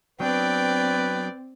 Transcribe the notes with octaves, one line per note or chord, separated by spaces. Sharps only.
F#3 B3 C4 D4 B4 D5 G5